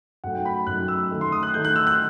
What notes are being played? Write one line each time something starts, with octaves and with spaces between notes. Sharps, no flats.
F#2 F#3 A3 D#4 F#5
G5
B5
F#2 F#3 A3 D#4 F#6
E6
D#3 A3 D#4
C6
D#6
F#6
D#3 A3 D#4 G6
F#6
E6
F#6